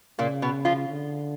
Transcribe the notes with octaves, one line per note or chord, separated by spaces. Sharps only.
A#2 C#3 A#3
B2 B3
F3 F4
D3